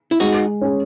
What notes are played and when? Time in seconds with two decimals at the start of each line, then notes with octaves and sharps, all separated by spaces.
0.11 E4
0.20 G#3 D#4 F#4
0.61 C#4 G#4